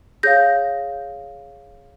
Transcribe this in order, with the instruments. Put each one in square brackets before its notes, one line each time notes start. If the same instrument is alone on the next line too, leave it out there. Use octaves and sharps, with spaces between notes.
[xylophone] G#4 C#5 F5 G6 A#6